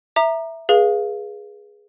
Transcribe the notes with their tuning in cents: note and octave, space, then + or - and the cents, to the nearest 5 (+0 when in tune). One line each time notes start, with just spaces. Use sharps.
E5 +0 A#5 +0 D6 +45
G#4 +0 B4 -30 F5 -5